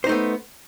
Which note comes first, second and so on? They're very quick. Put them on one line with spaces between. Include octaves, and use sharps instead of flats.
C5 D#4 A3 B3